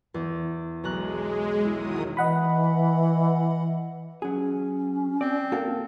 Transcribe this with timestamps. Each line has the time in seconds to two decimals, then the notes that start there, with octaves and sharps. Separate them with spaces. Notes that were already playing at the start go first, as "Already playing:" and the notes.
0.14 E2
0.84 B1 G#3 A#5 F#6
1.65 D#3 F#3 E4 D#6
2.17 E3 D#5 F#5 B5
4.22 F#3 C#4 G#4
5.21 C4 D5
5.52 A#3 F#4 A4